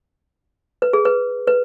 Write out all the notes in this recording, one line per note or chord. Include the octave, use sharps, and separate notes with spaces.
B4
G#4
B4
B4